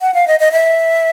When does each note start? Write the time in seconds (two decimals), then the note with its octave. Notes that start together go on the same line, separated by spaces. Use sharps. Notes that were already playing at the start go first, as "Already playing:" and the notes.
0.01 F#5
0.14 F5
0.27 D#5
0.40 D#5
0.52 E5